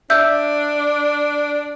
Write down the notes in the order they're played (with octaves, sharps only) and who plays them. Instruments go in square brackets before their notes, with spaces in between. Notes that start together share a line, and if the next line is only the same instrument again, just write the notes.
[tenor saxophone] D4 [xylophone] E5 E6 G6